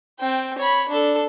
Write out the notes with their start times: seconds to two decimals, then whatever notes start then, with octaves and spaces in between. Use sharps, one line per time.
0.19 C4 G5
0.58 C#5 B5
0.89 D4 A4